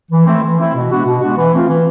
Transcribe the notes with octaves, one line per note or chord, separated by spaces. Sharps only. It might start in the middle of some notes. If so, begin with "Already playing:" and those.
E3
A3 C4 E4
E3
A3 C4 E4
B2
G#3 B3 D4 F#4
B2
G#3 B3 D4 F#4
E3
A3 C4 F4
E3